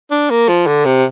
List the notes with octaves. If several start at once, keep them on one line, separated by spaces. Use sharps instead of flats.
D4
A#3
F3
D3
C3